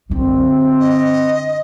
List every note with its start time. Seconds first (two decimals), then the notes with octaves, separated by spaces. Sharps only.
0.10 F#2 D3 C4
0.80 D#5